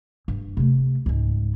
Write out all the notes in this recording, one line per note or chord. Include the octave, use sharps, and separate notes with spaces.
G2
C3 A3
C#2 G#2